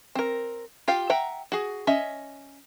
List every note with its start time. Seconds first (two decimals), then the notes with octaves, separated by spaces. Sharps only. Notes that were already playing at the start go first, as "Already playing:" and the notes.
0.15 C4 A#4
0.88 F4 G4 F5
1.10 E5 F#5 G5 A#5
1.52 F#4 G#4
1.87 C#4 D#5 E5